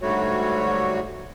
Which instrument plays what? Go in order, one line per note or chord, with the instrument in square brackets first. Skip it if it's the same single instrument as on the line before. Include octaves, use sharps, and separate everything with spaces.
[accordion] G#2 D3 G3 A3 F#4 C#5